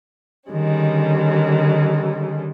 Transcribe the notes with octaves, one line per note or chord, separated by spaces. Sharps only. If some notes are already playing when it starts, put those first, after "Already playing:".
D3 D#3 G3 G#3 C#4